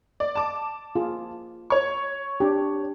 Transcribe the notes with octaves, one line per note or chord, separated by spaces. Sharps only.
D5
A5 D6
F4 G#4
C#5 C#6
D4 G4